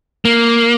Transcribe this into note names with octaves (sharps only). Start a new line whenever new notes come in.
A#3